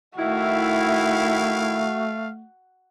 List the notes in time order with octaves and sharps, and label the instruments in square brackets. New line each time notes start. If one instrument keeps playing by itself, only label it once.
[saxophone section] D#3 E4 [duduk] A3 [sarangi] F#4 [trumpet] F5